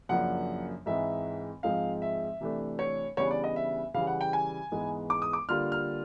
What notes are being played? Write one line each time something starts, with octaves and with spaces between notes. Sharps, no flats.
F#2 C#3 F3 A#3 D4 F#5
G#2 E3 G#3 C4 E5
G#2 F3 G#3 C4 F5
E5
C3 E3 A3 D4
C#5
C#3 E3 G3 B3 D4 C#5
D5
D#5
E5
C#3 E3 G3 F5
F#5
G5
G#5
G#2 E3 G#3 B3
D6
D#6
D6
D3 G3 A#3 D4 F4 F6
F6